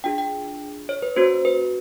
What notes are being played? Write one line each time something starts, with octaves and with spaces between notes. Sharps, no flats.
D4 F4 G#4 G5
G5
C#5
B4
A#3 C#4 F#4 C5
B4